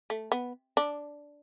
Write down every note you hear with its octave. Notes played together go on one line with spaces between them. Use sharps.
A3
B3
D4